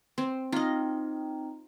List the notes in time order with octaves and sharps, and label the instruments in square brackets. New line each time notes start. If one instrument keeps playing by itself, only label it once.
[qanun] C4
[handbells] C4 D#4 [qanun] F4 D#5